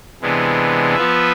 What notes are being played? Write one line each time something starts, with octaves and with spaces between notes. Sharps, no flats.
C3 E3 G#3 B3 D4
F3 B3 F4 B4 E5